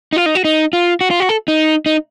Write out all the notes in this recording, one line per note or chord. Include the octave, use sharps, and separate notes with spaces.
D#4
F4
D#4
F#4
D#4
F4
F#4
F4
F#4
A4
D#4
D#4